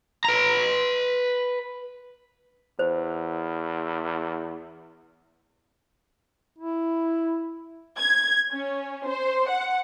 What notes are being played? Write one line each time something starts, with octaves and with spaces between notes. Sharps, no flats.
B4 A#5
E2 C5
E4
G#6
C#4
C5
F#5